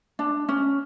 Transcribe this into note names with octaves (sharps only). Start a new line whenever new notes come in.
D4
C#4